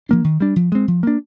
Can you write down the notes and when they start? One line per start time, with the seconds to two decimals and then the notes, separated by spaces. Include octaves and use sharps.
0.09 F3 A#3 D4
0.24 D#3
0.40 G3 D4
0.56 F3
0.72 G#3 C4
0.88 F3
1.03 A#3 D4